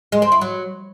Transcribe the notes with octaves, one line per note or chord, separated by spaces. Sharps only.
G#3
C4
E4
F#3